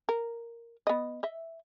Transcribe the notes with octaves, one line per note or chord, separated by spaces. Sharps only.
A#4
B3 D#5
D#5 E5